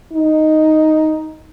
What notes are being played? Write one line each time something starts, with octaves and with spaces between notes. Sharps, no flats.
D#4